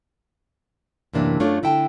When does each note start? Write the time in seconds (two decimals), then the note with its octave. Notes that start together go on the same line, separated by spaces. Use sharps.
1.13 F#2 A2 C3 E3 A#3 D4
1.40 F#2 A3 D4 F4 C#5
1.63 D3 E4 A4 G5 A5